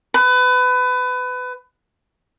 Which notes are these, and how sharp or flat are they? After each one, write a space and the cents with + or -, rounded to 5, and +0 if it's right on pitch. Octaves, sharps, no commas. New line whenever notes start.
B4 +25